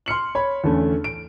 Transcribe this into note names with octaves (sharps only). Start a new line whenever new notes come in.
C6 F6 C#7 F#7
C#5 B5
E2 D3 A3 C#4
D7